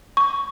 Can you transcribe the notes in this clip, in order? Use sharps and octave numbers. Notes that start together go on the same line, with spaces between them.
C#6